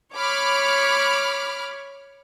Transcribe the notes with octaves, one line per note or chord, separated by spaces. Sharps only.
C#5 B5 D6 F6